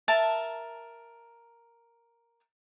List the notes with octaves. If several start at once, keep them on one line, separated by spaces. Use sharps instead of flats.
A#4 E5 A5